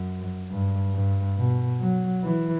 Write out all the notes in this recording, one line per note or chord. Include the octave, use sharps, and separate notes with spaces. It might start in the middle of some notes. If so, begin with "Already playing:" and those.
Already playing: F#2
G2
G2
B2
F#3
E3